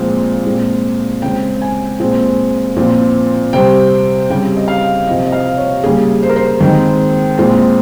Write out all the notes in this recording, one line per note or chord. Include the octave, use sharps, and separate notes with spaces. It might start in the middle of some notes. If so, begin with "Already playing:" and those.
Already playing: A#2 F3 G#3 C4
A#2 G#3 C4
C#3 G#3 C4 G5
G#5
A#2 G#3 C4
A#2 F3 C4
C3 G3 C4 G5
C#3 G3 C4 G5
D#5
F5
C3 F3 C4 D#5
D#5
F5
C#5
C#3 G3 A#3 G#4
C5
A#4
C5
D#3 G#3 C4
A#2 G#3 C4